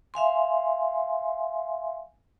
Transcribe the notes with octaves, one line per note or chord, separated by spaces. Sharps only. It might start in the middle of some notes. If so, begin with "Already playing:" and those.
E5 F5 G#5 C6